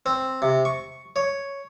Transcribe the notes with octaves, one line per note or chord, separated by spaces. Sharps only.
C4
C3
C#6
C#5